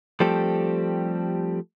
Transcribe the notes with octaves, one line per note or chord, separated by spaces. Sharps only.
F3 G3 A3 C4 G4 A4